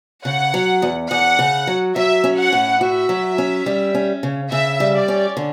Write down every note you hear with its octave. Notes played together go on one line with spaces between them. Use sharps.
C#3 F#5
F#3
E2
E2 F#5
C#3
F#3
F#3 E5
C#4
F#5
A2
F#4 E5
F#3
C#4
G3
C#4
C#3
C#3 E5
G3
D5
C#4
D3